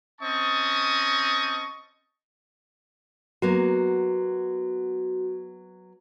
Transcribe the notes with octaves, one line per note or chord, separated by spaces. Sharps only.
C4 C#4 D#5 A5 C#6 D#6
F#3 A#3 B3 F#4